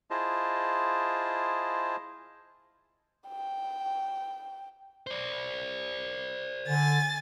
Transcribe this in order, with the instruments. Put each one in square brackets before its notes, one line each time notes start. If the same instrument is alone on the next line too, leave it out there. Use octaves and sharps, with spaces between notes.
[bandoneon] E4 F4 G#4 C5 D#5 A5
[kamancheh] G5
[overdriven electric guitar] C5 D5
[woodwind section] D3 [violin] G#5 A6